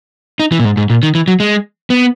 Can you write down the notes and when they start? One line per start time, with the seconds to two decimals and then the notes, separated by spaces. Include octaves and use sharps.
0.40 D#4
0.52 E3
0.60 A#2
0.65 G#2
0.77 G#2
0.90 A#2
1.03 D#3
1.15 E3
1.28 F#3
1.40 G#3
1.90 B3